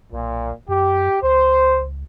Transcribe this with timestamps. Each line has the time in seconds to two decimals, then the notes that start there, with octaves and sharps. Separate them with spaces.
0.13 B1 A#2
0.68 F#2 G4
1.23 C#2 C5